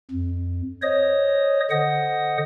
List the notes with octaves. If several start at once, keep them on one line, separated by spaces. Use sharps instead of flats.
F2
C5 C#5 D#5 D#6
D3 C5 D#5 F#5 D#6